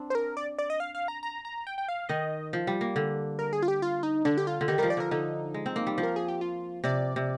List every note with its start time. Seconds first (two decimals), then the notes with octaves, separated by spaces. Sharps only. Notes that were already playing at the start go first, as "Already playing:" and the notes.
Already playing: C4 D4
0.10 C5
0.15 A#4
0.37 D5
0.58 D5
0.70 D#5
0.80 F5
0.95 F5
1.08 A#5
1.23 A#5
1.45 A#5
1.67 G5
1.78 G5
1.88 F5
2.09 D#3 D#5
2.53 F3
2.67 G3
2.81 A#3
2.96 D3
3.39 A#4
3.53 G#4
3.63 F4
3.68 G4
3.82 F4
4.03 D#4
4.25 D3 D4
4.38 G4
4.47 F4
4.61 D3
4.68 D#3 G4
4.78 F3 G3 A#4
4.90 D5
4.97 D3 A#4
5.11 D3 D#4
5.54 G#3
5.66 C4
5.76 A#3
5.87 G3
5.98 F3
6.03 A#4
6.16 G#4
6.28 G4
6.41 F4
6.84 C3 D5
7.16 C3